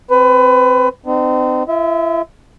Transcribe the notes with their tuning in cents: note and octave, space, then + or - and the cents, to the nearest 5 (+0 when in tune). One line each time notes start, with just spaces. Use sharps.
C4 +0 B4 +25
C4 -35 D#4 -40
E4 +45 E5 -25